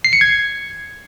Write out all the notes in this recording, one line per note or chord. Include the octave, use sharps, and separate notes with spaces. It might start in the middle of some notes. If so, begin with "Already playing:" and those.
C7
C#7
G#6